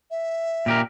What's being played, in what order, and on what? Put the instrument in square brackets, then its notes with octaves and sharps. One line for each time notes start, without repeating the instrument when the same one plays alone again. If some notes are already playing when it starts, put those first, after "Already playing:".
[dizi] E5
[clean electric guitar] A#2 G4 A#4